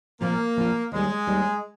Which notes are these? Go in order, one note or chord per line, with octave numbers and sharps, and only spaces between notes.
A#2 F3 A#3 C4 F4
A#2 F3 C4 F4
D#2 D#3 G3 G#3
D#2 D#3 G3